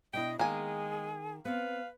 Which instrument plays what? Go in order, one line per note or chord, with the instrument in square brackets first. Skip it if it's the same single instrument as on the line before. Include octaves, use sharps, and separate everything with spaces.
[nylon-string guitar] B2 D4 E4 [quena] D#5 [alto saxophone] G5
[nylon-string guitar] D#3 [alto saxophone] G#3 [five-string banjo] A#3 G#5 [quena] G#4
[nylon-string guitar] B3 C4 [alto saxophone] B4 [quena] F5